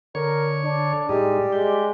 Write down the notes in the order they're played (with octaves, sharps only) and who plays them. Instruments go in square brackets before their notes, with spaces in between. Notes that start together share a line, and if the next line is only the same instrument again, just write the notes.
[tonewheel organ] D3 C#5 [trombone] A#4
[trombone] D4
[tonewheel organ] A2 D#4 [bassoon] G3 [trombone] G#3
[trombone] G#3 [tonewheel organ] G4